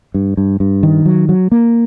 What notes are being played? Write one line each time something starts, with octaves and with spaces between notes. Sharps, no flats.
G2
G2
G2
D#3
F#3
F#3
A#3